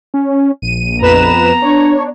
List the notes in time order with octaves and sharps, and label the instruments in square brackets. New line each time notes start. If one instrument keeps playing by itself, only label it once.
[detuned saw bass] C#4
[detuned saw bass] A#1 [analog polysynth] D#7
[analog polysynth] F2 B4 E7 [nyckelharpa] B3 A#5
[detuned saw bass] D4 [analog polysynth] C#5